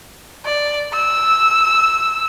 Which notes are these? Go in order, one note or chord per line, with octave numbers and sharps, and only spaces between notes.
D5
E6